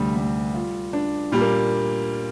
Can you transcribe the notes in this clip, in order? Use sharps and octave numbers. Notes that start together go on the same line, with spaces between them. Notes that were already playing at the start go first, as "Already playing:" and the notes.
Already playing: D2 C3 G3
G3
F4
D4
A#2 G3
A#3